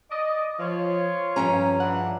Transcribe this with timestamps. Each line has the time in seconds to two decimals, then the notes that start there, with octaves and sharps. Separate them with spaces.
0.11 D5 D#5
0.59 F3 F4 C#5
1.36 G2 F3 C#4 A#5
1.80 C#3 E3 D4 F#5